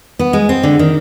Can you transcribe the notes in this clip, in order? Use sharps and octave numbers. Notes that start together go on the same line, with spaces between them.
B3
G#3
C4
D3
D#3